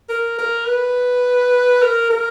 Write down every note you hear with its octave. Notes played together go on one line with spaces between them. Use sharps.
A#4
A#4
B4
A#4
A#4